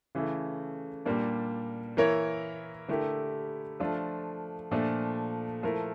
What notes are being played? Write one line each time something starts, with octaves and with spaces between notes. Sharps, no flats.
C#3 E3 A3
A#2 G3 A#3 D4
E3 A#3 E4 A#4 C#5
D3 A3 E4 G4 A#4
F3 A3 D4 F4
A#2 F3 A3 D4
F3 A3 E4 A#4